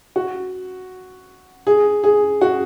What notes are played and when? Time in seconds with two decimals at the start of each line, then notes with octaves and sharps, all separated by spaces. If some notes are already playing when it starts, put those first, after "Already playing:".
0.16 F#4
1.67 G#4
2.04 G#4
2.41 F#4